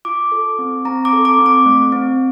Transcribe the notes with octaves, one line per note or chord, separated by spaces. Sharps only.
F4 D6
A4
C4
C4 A#5
D6
A4
D6
C4
D6
A3
C4